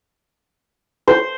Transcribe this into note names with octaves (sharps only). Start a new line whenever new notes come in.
C5